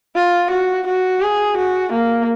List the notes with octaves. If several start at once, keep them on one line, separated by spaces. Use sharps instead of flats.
F4
F#4
F#4
G#4
F#4
A#3